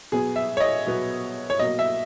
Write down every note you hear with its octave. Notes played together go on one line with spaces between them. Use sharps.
B2 F#3 B3 G#4
E5
C#5
D#5
B2 F#3 B3
C#5
B2 F#3 A#3 D#5
E5